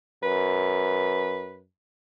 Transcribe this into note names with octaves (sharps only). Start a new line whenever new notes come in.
F#2 B4